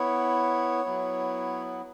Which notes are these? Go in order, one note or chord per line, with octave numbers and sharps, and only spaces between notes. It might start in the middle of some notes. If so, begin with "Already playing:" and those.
Already playing: B3 E4 C#5
F#3 B3 E4